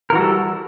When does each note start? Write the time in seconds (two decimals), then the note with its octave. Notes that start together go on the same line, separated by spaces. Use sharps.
0.10 A#4
0.13 E3
0.15 F#4
0.18 G3
0.20 A4